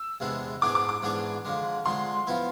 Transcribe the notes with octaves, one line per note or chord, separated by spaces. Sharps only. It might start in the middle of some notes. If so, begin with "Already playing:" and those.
Already playing: E6
E2 C3 G#3 B3 D4
G#2 E3 B3 D4 G#4 D6
D6
D6
G#2 E3 B3 D4 G#4
F2 D3 G#3
F2 D3 G#3 C6
F3 B3 E4